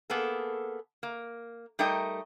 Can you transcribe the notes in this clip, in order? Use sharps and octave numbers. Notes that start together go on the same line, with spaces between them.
A#3 B3 G#4 A4
A#3
G3 A3 D#4 A#4 D#5 G5